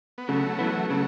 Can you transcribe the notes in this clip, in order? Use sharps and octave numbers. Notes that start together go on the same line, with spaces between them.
B3
C#3 F#3 A3
E3 B3
C#3 F#3 A3